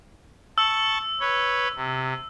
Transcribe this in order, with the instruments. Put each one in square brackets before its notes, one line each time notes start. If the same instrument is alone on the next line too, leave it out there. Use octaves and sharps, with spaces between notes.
[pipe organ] A5 C#6 [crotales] E6
[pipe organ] B4 C#5
C3